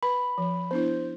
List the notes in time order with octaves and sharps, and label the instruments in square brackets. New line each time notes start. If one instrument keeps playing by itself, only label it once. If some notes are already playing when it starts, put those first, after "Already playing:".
[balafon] B4 [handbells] B5
[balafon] F3
[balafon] B3 D4 E4 [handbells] C5